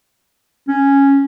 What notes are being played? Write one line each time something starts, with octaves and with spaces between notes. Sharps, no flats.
C#4